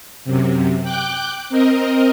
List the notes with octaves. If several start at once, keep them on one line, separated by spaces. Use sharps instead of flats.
F#2 C3
G5 D6 F#6 G6
C4 A#4 D#5